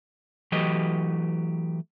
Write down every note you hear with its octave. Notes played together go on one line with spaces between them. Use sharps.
E3 F#3 A3 G4 B4 D#5